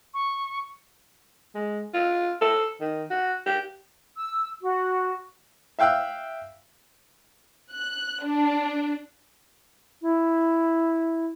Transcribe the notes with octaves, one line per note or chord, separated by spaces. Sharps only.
C#6
G#3
F4
A4
D#3
F#4
G4
E6
F#4
E5 F5 G5 E6 F#6
F#6
D4
E4